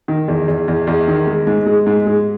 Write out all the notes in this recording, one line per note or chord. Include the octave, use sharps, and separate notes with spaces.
D#3
E2
E2
E2
E2
D#3
G#3
G#2
G#3
G#2
G#3